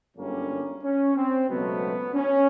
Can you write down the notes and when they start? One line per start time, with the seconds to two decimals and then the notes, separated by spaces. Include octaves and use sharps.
0.16 G1 F#2 D3 G3 A#3 C#4
0.83 C#4
1.15 C4
1.49 C#2 B2 F#3 A3 B3
2.14 C#4